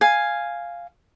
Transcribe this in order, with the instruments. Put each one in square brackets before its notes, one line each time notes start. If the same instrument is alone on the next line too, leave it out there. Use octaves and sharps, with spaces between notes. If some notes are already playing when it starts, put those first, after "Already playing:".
[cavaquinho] F5 G#5